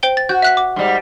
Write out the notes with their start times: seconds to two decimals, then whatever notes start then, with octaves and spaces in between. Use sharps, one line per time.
0.03 C5 G5 G7
0.17 A6
0.29 F#4 G6
0.42 E5 F#6 B6
0.57 D6
0.76 G#2 G3